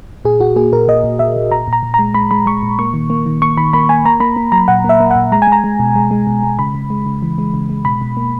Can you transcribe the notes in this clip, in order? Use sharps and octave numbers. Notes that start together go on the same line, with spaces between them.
A#2 G#4
A#2 F#4
A#3 G#4
A#2 A#4
A#2 D#5
A#2
A#2 E5
A#2
A#2 A#5
A#2 A#5
A#2
G#3 A#5
G#3 B5
G#3 B5
G#3 C#6
A#2
A#3 C#6
D#3
A#3
D#3
A#3 C#6
D#3 B5
A#3 B5
A#3 G#5
A#3 A#5
A#3 B5
A#3
F#3 A#5
A#2 F#5
A#3 E5
A#3
F#5
A#2
G#3 A#5
G#5
G#3 A#5
G#3
B2
G#3
G#3
B2
G#3
C#3 B5
C#3
G#3
C#3
E3
G#3
C#3
G#3
B2 B5
B2
A#3